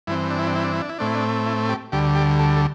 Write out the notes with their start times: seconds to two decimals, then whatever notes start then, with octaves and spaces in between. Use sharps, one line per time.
0.07 G2 E3 C4 E4
0.31 D4
0.39 E4
0.47 D4
0.56 E4
0.64 D4
0.73 E4
0.81 D4
0.89 E4
0.99 A2 A3 C4 D4
1.07 E4
1.15 D4
1.46 E4
1.69 G4
1.92 D2 D3 G3 G4
2.15 G4
2.39 A4
2.56 A4